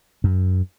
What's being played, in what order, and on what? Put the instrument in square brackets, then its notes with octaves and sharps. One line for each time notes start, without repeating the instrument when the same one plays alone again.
[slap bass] F#2